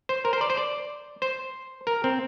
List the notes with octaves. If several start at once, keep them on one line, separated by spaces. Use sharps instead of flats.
C5
A#4
C5
D5
C5
D5
C5
A#4
C4